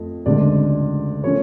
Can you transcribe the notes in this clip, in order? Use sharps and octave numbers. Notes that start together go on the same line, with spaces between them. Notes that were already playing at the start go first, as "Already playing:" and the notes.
Already playing: F2 F3 A3
D2 C#3 G#3 D4 D5
F3 A3 C#4 C#5